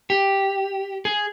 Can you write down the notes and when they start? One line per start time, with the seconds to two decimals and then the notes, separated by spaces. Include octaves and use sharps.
0.10 G4
1.05 G#4